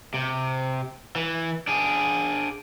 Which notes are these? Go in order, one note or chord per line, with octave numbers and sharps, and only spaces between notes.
C3
E3
D4 G#4